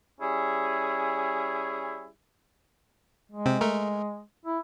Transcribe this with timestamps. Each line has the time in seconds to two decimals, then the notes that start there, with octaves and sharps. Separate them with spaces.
0.21 G3 C#4 E4 G#4
3.32 G#3
3.46 C3 C4
3.61 A3 A#4
4.46 E4